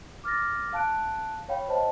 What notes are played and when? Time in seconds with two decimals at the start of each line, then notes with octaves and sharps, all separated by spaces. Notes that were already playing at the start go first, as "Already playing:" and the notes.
0.24 D6 F6 A6 A#6
0.73 F5 A5 F#6 D7
1.48 C#5 F5 G5 B5
1.68 C5 D#5 G5 A5